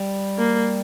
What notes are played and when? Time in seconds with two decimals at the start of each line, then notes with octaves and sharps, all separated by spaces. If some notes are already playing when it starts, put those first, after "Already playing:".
Already playing: G3
0.38 A#3